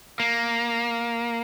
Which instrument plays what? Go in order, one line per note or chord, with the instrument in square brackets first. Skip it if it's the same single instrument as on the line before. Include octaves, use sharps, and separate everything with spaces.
[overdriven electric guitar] A#3